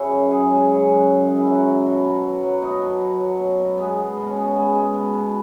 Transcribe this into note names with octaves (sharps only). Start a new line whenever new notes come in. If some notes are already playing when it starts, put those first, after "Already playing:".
Already playing: C#3 E4 F#4
F#2
F#2 G#4
G#3
C#3
F#2
F#2
G#3
E4
F#3 F#4
F#3
B2
B2
F#3
F#3
B2 D#4
B2
F#3
F#3
B2
B2
G#3 B3
G#3
B2
C#4
B2 B3
G#3
G#3
B2
B2